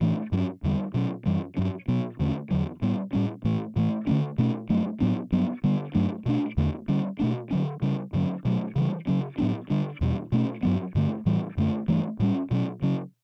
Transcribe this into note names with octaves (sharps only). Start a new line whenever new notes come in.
A2 E3 A3 D4
G2 F#3 C#4
E2 D3 G3
B2 F#3 C#4
F#2 E3 G3
G2 F#3 C#4
B2 F#3 B3
E2 D3 A3 C#4
E2 D3 F#3
A2 G3 B3
A2 G3 C#4
A2 E3 A3
A2 E3 A3
D3 F#3 A3 C#4
B2 A3 C#4
G2 F#3 A3
A2 F#3 B3 D4
G2 F#3 B3
D3 G3 B3
G2 F#3 A3 D4
B2 A3 D4
E2 D3 A3
D3 G3 C#4
B2 A3 D4
D3 F#3 C#4
C#3 G3 C#4
G2 D3 F#3 C#4
B2 F#3 A3
C#3 E3 G3
C#3 F#3 C#4
A2 F#3 B3 D4
D3 G3 D4
E2 B2 G3
B2 A3 C#4
G2 F#3 B3
G2 D3 A3
A2 E3 G3
F#2 D3 A3
G2 E3 A3
A2 G3 C#4
B2 F#3 C#4
C#3 F#3 C#4